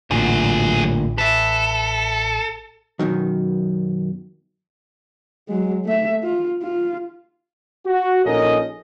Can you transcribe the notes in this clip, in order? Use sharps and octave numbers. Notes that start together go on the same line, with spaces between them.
A1 D2 A#2 F#3 G#4
A4 B4 E5
F#2 B2 D#3 F#3
F#3 G#3
A3 E5
F4
F4
F#4
A#1 C#4 D#4 A4 A#4 D#5